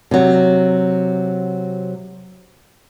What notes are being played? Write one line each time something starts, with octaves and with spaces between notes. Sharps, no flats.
C3 F#3